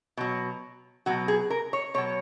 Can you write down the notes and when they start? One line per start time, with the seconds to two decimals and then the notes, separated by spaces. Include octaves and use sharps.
0.17 B2 F#3
1.06 B2 F#3 F#4
1.28 G#4
1.50 A#4
1.73 C#5
1.94 B2 F#3 C#5